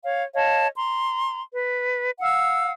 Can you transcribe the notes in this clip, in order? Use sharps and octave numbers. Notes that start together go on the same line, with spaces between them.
C#5 F5
C#5 D#5 F5 A5
A#5 C6
B4
F5 F#5 E6